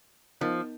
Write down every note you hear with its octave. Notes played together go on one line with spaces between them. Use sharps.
F3 B3 D#4 A#4 D#5